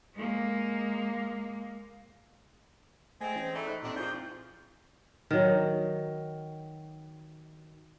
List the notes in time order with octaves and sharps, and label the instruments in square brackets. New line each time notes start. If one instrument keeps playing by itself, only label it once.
[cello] G#3 A#3
[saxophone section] G#3 C4 [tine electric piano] A3 [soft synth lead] G#5
[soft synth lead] E3 [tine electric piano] C#4 C5
[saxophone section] G#2 A3 [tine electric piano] D5 B5
[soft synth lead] D#4 [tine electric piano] F#6
[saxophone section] D#2 D4 [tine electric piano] A#2 C4
[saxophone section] G#2 F3 [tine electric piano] C4 E4 F4 [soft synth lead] G6
[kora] D#3 F#3